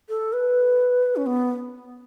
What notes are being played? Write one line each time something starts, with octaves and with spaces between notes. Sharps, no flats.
A4
B4
C#4
B3